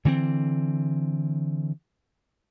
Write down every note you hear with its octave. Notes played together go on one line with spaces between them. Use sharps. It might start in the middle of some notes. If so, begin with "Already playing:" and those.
D3 E3 B3 C4